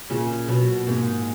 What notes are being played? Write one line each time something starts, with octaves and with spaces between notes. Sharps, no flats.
A#2 C#3
B2 F#3
G#2 A#3